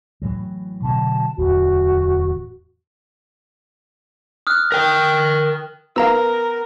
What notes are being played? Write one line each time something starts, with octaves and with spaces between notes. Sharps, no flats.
A2 E3 F#3
B2 D3 F#3 A5
D1 E2 F#4
D#6 F6 F#6
A#4 G5
F6
B3 A#4 F5 A#5 E6